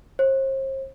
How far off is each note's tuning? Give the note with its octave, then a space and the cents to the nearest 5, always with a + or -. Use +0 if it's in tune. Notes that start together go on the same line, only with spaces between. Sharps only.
C5 +40